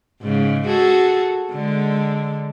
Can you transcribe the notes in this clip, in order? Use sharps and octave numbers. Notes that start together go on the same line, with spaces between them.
G#2 C#3
F#4 G#4 A4
D3 G#3